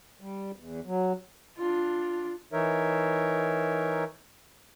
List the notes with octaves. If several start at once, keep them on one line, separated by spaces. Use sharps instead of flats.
G3
E2
F#3
D4 F4
E3 D#4 A#4 C#5 E5